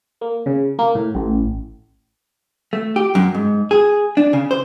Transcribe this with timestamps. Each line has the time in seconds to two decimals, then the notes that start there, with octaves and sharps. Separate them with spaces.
0.21 A#3
0.46 C#3
0.79 A#3
0.95 A2
1.15 A1
2.73 A3
2.96 G4
3.15 F#2
3.34 G#2
3.71 G#4
4.17 D4
4.33 C#3
4.51 C5